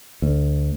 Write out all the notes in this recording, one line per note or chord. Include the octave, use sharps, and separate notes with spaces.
D2